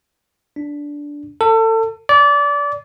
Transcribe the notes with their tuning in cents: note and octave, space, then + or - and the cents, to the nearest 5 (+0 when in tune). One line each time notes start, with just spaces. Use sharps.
D4 -10
A4 +30
D5 -25